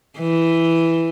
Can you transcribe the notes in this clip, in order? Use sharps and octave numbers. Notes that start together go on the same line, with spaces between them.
E3